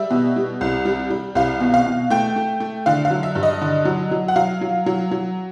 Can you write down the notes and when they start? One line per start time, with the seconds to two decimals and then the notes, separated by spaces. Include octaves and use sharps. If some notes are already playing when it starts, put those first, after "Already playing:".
Already playing: G3 E5
0.11 B2
0.36 G3
0.61 C2
0.85 G3
1.10 G3
1.35 C2 F5
1.60 B2
1.74 F5
1.87 B2
2.10 A3 G5
2.36 A3
2.60 A3
2.86 D3 F5
3.05 F5
3.11 F#3
3.23 E5
3.35 G2
3.43 D#5
3.62 D3
3.85 F#3
4.11 F#3
4.28 F#5
4.36 F#3 F5
4.61 F#3
4.86 F#3
5.11 F#3